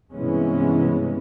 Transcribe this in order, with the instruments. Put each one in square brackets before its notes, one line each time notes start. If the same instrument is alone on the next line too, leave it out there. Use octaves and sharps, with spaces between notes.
[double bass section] G2 C3 E3 G#3 B3 C#4